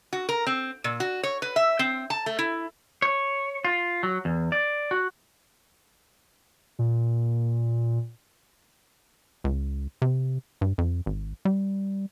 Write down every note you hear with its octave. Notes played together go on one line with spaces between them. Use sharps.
F#4
A#4
C4
A#2
F#4
C#5
B4
E5
C4
A5
A3
E4
C#5
F4
F#3
E2
D5
F#4
A#2
C#2
C3
G2
F2
G#1
G3